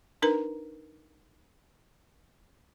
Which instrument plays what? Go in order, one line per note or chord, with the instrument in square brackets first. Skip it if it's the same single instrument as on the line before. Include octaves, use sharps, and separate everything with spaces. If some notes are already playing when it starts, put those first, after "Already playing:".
[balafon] D4 D#4 A#4 B4 A#5